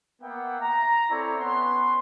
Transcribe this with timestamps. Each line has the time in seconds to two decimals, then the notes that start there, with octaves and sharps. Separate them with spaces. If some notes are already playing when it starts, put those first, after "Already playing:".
0.21 A#3 B3 E5 F#5 G5
0.61 A#5
1.10 C4 E4 A4 C#5 D5
1.39 B3 C#4 B4 C6